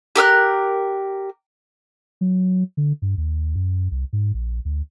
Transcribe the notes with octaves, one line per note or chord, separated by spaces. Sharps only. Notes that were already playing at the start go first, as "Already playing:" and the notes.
G4 A#4 E6 F#6
F#3
D3
G2
D#2
F#2
C2
G#2
A#1
D2